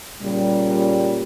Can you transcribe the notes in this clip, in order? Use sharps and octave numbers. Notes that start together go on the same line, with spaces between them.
A#2 C#3 G3